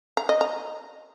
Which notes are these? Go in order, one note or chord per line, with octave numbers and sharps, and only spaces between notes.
A#5
D#5
A#5